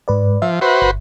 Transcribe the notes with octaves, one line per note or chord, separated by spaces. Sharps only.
G#2 B4 D5
F3 E5
F#4 B4 C5
G1